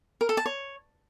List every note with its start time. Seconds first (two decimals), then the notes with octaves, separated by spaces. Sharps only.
0.21 A#4
0.29 A4
0.37 A5
0.46 C#5